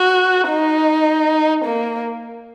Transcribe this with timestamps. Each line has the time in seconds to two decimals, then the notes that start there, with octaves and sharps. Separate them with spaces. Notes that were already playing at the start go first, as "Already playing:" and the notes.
Already playing: F#4
0.49 D#4
1.65 A#3